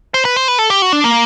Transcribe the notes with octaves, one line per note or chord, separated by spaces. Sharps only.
C5
B4
C5
B4
A4
G4
F#4
D4
A#3